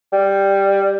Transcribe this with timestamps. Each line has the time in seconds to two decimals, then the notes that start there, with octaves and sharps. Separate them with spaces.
0.12 G3